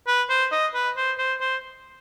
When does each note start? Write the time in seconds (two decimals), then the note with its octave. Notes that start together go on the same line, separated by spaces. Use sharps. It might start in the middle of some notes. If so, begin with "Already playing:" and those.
0.07 B4
0.30 C5
0.51 D#5
0.74 B4
0.97 C5
1.18 C5
1.41 C5